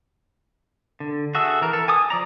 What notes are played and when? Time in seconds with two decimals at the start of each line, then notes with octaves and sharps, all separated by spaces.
1.00 D3
1.35 F#4 G#4 A4 E5
1.62 E3 A#4
1.73 A4
1.88 G#5 D6 D#6
2.10 F3 D5 A#5